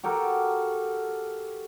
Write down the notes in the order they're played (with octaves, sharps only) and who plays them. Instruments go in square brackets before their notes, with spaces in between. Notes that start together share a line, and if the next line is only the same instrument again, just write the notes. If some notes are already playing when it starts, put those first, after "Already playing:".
[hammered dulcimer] F#4 G4 A4 A#4